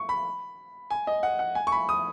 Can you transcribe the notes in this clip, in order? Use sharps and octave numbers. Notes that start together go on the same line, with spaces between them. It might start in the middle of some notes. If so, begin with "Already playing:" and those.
Already playing: C#6
B5
G#5
D#5
F#5
F#5
G#5
C#6
B5
D#6